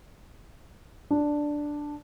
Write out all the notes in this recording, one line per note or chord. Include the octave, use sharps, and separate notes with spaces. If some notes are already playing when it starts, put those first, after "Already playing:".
D4